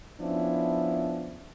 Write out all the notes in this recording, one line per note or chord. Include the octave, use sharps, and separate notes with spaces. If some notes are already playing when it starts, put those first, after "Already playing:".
F3 B3 C#4 D4 E4